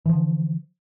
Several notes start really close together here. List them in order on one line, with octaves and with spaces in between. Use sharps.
E3 F3 D3